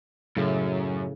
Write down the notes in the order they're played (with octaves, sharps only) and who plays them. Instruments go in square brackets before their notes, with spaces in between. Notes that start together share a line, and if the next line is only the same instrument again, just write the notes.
[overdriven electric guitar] F#2 [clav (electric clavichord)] A2 C#3